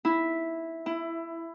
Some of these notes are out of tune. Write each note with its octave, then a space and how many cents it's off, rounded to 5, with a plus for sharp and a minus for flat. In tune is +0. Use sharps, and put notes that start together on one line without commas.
E4 -5
E4 +15